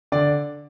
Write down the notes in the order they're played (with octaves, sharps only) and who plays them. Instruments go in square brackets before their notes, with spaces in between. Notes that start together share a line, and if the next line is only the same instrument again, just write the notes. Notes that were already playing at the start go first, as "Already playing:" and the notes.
[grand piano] D3 D5